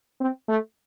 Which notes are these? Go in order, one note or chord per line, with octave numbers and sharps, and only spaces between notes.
C4
A3